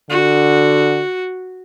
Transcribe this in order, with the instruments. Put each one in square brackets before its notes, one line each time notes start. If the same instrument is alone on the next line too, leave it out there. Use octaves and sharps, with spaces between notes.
[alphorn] D3 [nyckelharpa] F#4